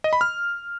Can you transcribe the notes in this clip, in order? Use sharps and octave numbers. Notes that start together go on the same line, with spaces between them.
D#5
B5
F6